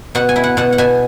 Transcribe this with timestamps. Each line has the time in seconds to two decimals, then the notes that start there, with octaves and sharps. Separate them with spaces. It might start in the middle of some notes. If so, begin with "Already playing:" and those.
0.15 B2 F#5
0.29 G#5
0.36 E4
0.44 F#5
0.57 B2 F#5
0.73 F#5
0.78 B2 G#5